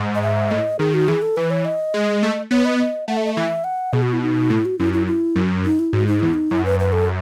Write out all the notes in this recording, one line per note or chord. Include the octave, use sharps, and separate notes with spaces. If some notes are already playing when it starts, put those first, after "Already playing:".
Already playing: G#2
D#5
E5
A2 D#5
D#3 G#4
F#4
E3 G#4
A4
E3 B4
C#5
D#5
G#3
A3
B3 C#5
D#5
D#5
A3 F#5
E5
D#5
E3 E5
F#5
B2 G#4
F#4
E4
D#4
A2 E4
F#4
F#2 E4
E4
E4
F#2
D#4
E4
G#2 F#4
D#4
E2 E4
D#4
F#2 E4
B4
B4
A4